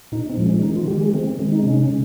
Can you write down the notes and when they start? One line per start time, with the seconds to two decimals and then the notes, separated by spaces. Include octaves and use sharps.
0.12 A#2 D#4
0.29 C4
0.37 F3 G#3
0.46 C#4
0.62 D#3 D#4
0.76 F4
0.87 G#3 G4
1.01 G#4
1.14 D#3 C4
1.39 G#3
1.52 D#4
1.63 C3 C#4
1.89 G#3